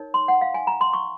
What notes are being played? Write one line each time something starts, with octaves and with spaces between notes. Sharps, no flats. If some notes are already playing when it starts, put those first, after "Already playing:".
Already playing: D#4 A#4 C#5
C6
F#5
F5
G#5
A#5
C6
C#6